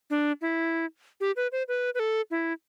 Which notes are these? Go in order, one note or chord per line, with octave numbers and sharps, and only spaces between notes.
D4
E4
G4
B4
C5
B4
B4
A4
E4